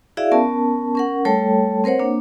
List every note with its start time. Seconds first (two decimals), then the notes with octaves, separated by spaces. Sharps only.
0.17 E4 F#4 G#4 D5 E5 F5
0.32 B3 C#4 A#4 A5
0.95 C#4 A#4 F#5
1.25 G3 A3 A4 C#5 G5 A5
1.84 C4 A#4 C5 C#5 F#5
1.99 A#3 D4